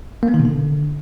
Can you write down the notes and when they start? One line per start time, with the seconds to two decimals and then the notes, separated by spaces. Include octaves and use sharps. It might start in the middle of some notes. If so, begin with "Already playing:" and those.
0.23 A#3
0.28 B3
0.34 D#3
0.40 B2
0.45 D3